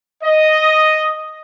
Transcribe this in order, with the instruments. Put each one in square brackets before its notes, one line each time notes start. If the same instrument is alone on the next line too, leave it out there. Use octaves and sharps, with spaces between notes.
[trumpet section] D#5